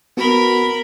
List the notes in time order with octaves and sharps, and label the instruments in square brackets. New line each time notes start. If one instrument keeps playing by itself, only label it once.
[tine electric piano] B3 F#4 [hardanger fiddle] A#4 B5